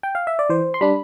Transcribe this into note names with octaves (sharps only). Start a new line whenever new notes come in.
G5
F5
E5
D5
E3 C5
C6
G3 D4 B5